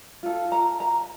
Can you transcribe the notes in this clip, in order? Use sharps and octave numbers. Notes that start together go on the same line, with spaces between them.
F4 A4
A#5
A#5